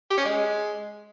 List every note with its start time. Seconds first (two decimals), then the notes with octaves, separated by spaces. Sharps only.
0.10 G4
0.18 C#4
0.25 G#3